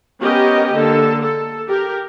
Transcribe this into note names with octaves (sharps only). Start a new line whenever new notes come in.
B3 C#4 G4 A#4 D#5
D3 A#3 A4
A4
G4 A#4